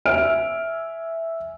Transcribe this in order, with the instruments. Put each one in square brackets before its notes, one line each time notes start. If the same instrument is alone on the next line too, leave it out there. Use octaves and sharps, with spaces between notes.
[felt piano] E5 G#5 F6 D7